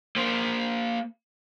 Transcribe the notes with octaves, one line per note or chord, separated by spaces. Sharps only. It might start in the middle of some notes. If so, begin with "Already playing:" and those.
A#3 C5